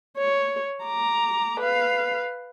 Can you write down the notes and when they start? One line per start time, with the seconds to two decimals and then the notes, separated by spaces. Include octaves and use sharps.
0.17 C#5
0.84 A#5 D6
1.60 B4 F5